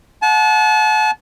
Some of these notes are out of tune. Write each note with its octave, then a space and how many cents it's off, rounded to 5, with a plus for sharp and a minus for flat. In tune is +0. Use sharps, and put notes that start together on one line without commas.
F#5 -25 A5 -35